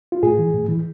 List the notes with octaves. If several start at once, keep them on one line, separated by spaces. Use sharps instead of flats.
F4
A2 G#4
E3
A2
E3